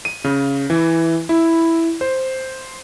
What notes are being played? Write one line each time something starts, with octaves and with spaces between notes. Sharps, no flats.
D#7
C#3
E3
E4
C5